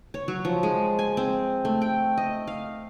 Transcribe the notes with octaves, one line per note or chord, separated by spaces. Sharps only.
C#5
F#3
F3
G#3
G#5
C4
A3
G5
D#5
F5